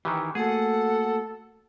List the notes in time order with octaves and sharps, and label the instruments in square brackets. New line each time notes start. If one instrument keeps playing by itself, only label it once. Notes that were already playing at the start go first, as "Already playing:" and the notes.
[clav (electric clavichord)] D#3 E3 [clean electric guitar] G4
[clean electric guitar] A3 A#3 F#4 [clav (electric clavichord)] G#4 [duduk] A4 [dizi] F#5